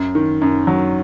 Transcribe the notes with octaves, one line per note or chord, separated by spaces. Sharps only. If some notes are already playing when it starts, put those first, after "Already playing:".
Already playing: F#2
D#3
F#2
F#3